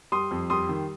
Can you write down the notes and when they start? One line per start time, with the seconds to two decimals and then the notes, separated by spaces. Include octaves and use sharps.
0.12 G3 C6 D#6
0.31 F2
0.50 G3 C6 D#6
0.69 D#3